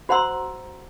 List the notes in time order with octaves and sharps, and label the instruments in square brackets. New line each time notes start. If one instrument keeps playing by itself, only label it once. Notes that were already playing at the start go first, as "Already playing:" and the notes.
[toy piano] F#4 C5 F#5 A#5 C6 E6